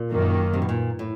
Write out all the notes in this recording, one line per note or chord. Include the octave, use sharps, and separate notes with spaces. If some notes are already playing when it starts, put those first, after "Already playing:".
Already playing: A#2
F#2 D#3 F#3 A#3
C3
B2
A#2
A2